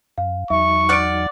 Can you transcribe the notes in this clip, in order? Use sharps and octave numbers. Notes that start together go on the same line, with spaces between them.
F#2 F5
E2 F#3 D#4 E5 C#6
D5 F#5 F6 C#7 D7